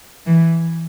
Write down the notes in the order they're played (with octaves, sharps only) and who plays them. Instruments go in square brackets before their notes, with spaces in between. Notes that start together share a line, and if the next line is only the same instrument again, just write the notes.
[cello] E3